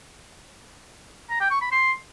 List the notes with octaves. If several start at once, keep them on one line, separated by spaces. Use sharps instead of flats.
A#5
G5
C#6
B5
C6